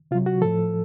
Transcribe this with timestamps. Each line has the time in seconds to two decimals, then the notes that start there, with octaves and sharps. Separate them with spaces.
0.11 C3 F4
0.15 F#3
0.26 F#4
0.41 A2 F3 A4